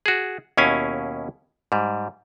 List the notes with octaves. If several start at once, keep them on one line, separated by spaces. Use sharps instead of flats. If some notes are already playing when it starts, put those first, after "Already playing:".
F#4 G#4
D#2 B2 C#4 E4 F5 G#5
G#2 G3